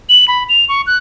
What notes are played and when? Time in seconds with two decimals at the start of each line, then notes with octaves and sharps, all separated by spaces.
0.09 F#7
0.28 B5
0.49 F7
0.69 C#6
0.87 F#6